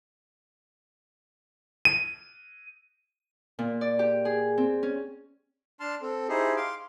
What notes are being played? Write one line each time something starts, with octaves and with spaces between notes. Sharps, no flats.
D#7
A#2
D5
G4
G#4
C4
C#4
D4 A5 C6 F6
C4 A4
D#4 E4 G4 G#4 C5
F5 C6 D6